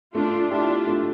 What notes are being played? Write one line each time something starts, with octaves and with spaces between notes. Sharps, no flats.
A3 D4 F4
D4 E4 F4 G4 D5
A3